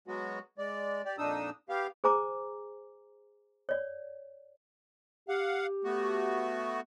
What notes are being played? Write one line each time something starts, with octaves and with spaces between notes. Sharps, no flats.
F#3 G#3 B3 F#4
G#3 D5
G4 D5
F2 A#2 D4 D#4 D#6 E6
B3 G4 F5
G#4 C5 G#5 A#5 D6
C#5 D5
G4 F5 F#5
A3 B3 F#4